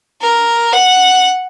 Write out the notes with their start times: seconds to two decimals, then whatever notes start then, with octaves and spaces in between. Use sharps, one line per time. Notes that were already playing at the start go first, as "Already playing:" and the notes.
0.21 A#4
0.73 F#5